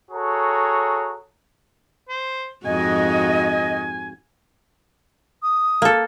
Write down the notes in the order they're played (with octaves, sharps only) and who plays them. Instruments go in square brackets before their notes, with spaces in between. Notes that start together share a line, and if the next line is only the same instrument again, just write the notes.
[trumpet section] F#4 G#4 A4 C#5 A#5
[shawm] C5
[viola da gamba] F2 G#2 F#4 [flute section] D#5 [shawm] G#5
[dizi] D#6
[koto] A#3 A4